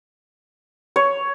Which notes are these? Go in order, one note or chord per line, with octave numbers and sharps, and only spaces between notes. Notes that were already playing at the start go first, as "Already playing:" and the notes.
C#5